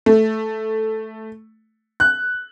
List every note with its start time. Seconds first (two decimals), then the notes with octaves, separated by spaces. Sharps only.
0.06 A3
2.00 F#6